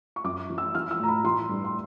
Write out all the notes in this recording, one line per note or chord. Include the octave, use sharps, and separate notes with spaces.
C#6
F#2 D6
E3
E6
E3 F6
E6
A2 A#5
B5
E3 C6
G2
C6